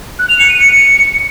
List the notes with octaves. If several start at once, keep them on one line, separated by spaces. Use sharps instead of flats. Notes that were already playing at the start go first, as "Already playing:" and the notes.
F#6
F7
C#7
D#7
C#7